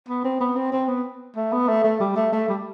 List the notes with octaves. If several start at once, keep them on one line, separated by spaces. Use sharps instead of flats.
B3
C4
B3
C4
C4
B3
A3
B3
A3
A3
G3
A3
A3
G3